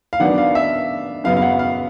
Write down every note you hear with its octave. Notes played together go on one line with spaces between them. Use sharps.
F5
D#3 F#3 B3 D4 F#5
F5
E5
F#2 C#3 F#3 B3 F5
F5
F#5
F5